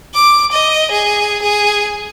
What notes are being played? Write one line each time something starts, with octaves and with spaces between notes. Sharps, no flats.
D6
D#5
G#4
G#4